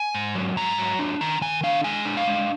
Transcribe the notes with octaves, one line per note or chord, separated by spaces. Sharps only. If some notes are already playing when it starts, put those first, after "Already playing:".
Already playing: G#5
G#2
F#3
G#2 A#5
F#3
D4
D#3 A#5
D#3 G#5
D4 F5
G#3 G#5
D4
F5
G#3